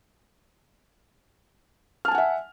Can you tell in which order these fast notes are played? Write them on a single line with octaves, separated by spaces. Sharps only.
F6 A5 G#5 F#5 E5